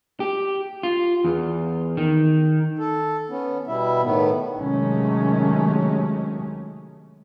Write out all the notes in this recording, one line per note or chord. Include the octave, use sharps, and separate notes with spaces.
G4
F4
E2
D#3
A4
B3 C#4
B2 G3 E4 E5
A2 D#3 B3
C3 D#3 F#3 G#3 A3 C#4